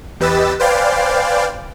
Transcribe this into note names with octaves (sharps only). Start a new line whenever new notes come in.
E2 G4 B4 D#5 E6 A6
B4 C5 D5 F5 G5 G#5